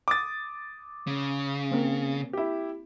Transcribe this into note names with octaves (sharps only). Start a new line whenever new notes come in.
D6 D#6 A6
C#3
A#3 C4
E4 G4